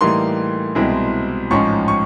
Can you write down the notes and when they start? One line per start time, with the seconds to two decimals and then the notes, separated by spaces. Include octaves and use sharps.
0.01 A2 E3 G3 A#3 D#4 C6
0.75 C2 B2 G#3 C4 E4
1.50 A1 G#2 F3 G#3 C#4 C#6
1.88 C#6